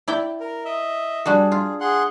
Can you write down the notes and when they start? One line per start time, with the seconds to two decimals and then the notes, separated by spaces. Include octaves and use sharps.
0.08 E4 D5 G5
0.40 A#4
0.65 D#5 E5
1.26 G3 D4 F#4 G#4
1.52 F4
1.80 G#4 F#5 C6